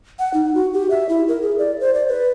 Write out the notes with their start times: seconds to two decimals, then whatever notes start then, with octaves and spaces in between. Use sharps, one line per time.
0.19 F#5
0.34 D#4
0.55 F#4
0.74 G4
0.90 E5
1.09 E4
1.28 A#4
1.42 G#4
1.59 D5
1.80 C5
1.95 D5
2.08 B4